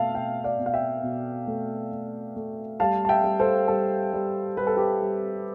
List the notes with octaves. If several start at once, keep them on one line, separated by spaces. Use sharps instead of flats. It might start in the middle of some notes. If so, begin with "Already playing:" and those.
Already playing: B2 A3 E5 F5 A5
B2 E5 G5
D5 F5
B2
F5
E5 G5
B2
A3
A3
A3
G3 F5 A5
A5
E5 G5
G3
A4 C5
G3 A4
G3
G3 B4
A4
G4 B4
G3